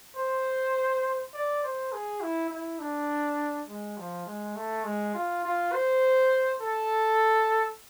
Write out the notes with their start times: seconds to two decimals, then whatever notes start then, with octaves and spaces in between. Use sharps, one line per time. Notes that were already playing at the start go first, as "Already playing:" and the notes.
0.17 C5
1.33 D5
1.63 C5
1.92 G#4
2.21 E4
2.50 E4
2.79 D4
3.68 G#3
3.98 F3
4.26 G#3
4.56 A3
4.84 G#3
5.14 F4
5.44 F4
5.72 C5
6.61 A4